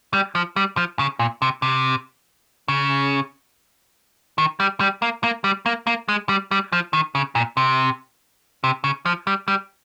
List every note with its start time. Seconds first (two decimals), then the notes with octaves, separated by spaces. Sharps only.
0.13 G3
0.35 F3
0.56 G3
0.77 F3
0.99 C#3
1.19 A#2
1.42 C3
1.62 C3
2.68 C#3
4.38 D#3
4.60 G3
4.80 G3
5.02 A#3
5.23 A#3
5.44 G3
5.66 A#3
5.87 A#3
6.09 G#3
6.29 G3
6.51 G3
6.73 F3
6.93 D#3
7.15 C#3
7.35 A#2
7.57 C3
8.64 C3
8.84 C#3
9.06 F3
9.27 G3
9.48 G3